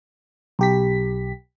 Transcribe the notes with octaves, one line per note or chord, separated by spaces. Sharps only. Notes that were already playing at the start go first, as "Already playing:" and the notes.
B1 G4 B6